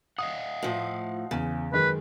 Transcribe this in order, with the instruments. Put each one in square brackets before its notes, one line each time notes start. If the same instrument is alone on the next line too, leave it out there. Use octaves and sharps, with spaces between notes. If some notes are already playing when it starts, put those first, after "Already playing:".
[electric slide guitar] D#5 F5 F#5 [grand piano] D#6
[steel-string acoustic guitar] A2 F3
[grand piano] E2 [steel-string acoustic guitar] C#3
[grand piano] F#2 D#3 G#3 [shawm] B4